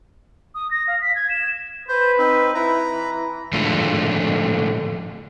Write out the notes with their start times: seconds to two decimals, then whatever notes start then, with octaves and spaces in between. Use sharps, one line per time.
0.55 D#6
0.71 A#6
0.87 F5
1.01 B6
1.16 G#6
1.30 E7
1.88 B4 C5
2.18 C4 D#4
2.54 E4 B4 A#5
2.91 E3
3.53 A2 D3 F3 G#3